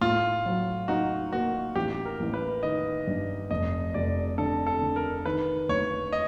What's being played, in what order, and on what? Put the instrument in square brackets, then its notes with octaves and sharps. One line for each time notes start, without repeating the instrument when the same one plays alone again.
[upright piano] A2 [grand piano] F4
[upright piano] F#3
[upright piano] D#4 [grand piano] F#4
[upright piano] A#3 [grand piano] F#4
[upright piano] A1 [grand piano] G4
[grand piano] A#4
[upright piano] A1
[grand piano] B4
[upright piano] D#3 [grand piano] D#5
[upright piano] G2
[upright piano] F1 [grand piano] D#5
[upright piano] F1 [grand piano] D5
[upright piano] D3 [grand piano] A4
[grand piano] A4
[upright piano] D3
[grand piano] A#4
[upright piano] D#3 [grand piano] B4
[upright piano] D2 [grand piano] C#5
[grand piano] D#5